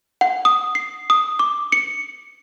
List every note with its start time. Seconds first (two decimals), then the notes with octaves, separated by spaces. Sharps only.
0.21 F#5
0.45 D#6
0.75 C7
1.10 D#6
1.39 D6
1.72 C#7